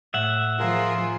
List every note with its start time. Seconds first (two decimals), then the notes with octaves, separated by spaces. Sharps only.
0.14 A2 E5 F#5 E6
0.59 F3 F4 G#4 A#4